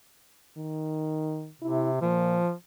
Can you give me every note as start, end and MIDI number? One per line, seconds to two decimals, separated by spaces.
0.57 1.50 51
1.62 2.01 48
1.62 1.89 64
2.01 2.40 46
2.01 2.52 53